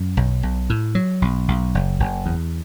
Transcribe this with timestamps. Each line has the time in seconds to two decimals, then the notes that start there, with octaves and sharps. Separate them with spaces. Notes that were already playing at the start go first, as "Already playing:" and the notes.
Already playing: F#2
0.17 B1
0.43 B1
0.70 A2
0.95 F#3
1.22 B1
1.48 B1
1.75 F#1
2.00 F#1
2.26 E2